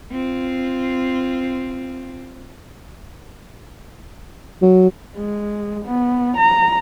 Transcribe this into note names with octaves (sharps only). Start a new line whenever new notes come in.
C4 F4
F#3
G#3
B3
A#5